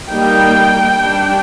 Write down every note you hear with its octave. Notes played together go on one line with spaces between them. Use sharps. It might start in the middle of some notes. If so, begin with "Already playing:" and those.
G3 A#3 D#4 G5
G3 D4